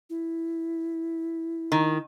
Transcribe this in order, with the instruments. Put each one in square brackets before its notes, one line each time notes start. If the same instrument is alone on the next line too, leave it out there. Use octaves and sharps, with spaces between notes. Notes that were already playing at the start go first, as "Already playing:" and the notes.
[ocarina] E4
[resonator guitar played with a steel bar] D#3